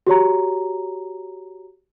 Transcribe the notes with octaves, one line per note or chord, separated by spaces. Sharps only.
F#4 G4 C#5 A#5